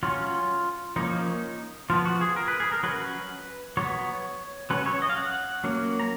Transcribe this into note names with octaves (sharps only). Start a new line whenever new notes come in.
F#3 C#4 F4
F3 A#3 C#4 D#4
F3 B3 F4
F#4
G#4
A#4
B4
G#4
A#4
F#3 C#4 B4
F#3 B3 C#5
F#3 C#4 B4
C#5
D#5
F5
F#5
F#3 A#3 C#4
A#5